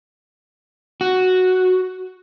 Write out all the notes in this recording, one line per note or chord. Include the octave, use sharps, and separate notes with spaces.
F#4